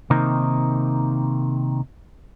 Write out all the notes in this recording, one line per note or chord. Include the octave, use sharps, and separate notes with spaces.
C3 D#3 A#3 C4 D#4